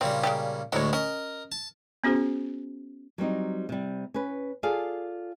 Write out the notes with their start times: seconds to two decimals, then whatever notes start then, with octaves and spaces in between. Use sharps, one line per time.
0.01 A#2 C#3 G3 C4
0.23 G#3 A#3 G4
0.72 D2 A2 F#3 G#3 C#5
0.93 C#4 A#4 D#5
1.52 A5
2.04 B3 C#4 F#4 G#4 C5
3.18 F#3 G3 C4 D#4
3.69 C3 G3
4.14 C#4 B4
4.63 F4 G#4 A4 D5 F5